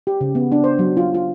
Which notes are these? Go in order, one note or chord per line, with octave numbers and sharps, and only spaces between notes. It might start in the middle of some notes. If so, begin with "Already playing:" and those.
G4
C#3
B3
D4
C5
F#3
F4
F4